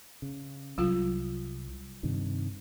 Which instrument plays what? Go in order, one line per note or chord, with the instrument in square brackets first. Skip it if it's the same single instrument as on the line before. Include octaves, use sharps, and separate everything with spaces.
[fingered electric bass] C#3
[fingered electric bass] C2 [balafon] F#3 F4
[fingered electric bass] G2 C3 D#3